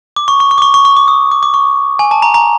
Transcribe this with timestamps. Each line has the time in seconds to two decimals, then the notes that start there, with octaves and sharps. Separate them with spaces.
0.16 D6
0.28 C#6
0.40 C#6
0.51 C#6
0.58 D6
0.62 C#6
0.74 C#6
0.85 C#6
0.97 D6
1.08 D#6
1.31 D6
1.43 D6
1.54 C#6
1.99 G#5
2.11 A5
2.22 A#5
2.34 A#5